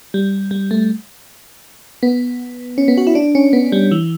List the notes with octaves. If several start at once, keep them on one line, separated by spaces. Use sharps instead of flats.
G3
G3
A3
B3
C#4
B3
F#4
E4
D4
C#4
B3
G3
E3